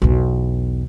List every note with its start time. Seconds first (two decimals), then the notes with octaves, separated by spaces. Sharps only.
0.02 B1 E2